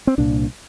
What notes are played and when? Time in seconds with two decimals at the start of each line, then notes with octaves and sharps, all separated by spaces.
0.07 C4
0.18 C2 A#2 D4